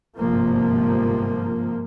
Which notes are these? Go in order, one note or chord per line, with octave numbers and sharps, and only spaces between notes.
G1 G#2 C3 F3 A#3